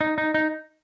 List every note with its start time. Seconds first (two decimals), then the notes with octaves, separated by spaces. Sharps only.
0.01 D#4
0.18 D#4
0.34 D#4